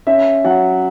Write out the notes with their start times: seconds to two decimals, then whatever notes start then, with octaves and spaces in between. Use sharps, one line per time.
0.07 C#4 E5
0.44 F#3 F#5